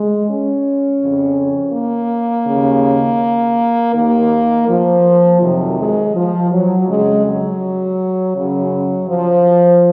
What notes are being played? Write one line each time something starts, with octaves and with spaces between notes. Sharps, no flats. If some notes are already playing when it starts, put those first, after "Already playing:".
Already playing: G#3
C#4
F2 C#3
A#3
D#2 C#3
D#2 D#3 A#3
F3
F2 C3 D#3 F#3
G#3
F3
F#3
F2 C#3 G#3
F#3
F#2 C#3 F#3
F3